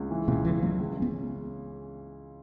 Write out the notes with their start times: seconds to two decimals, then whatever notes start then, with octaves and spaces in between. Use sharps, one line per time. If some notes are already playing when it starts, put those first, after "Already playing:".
Already playing: C#2
0.11 E3
0.28 C#2 B2
0.45 C#3 E3
0.62 C#2 F#3
0.79 C#2
0.97 C#3
1.02 B3
1.14 C#4